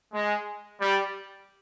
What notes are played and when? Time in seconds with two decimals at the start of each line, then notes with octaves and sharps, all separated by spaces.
0.14 G#3
0.80 G3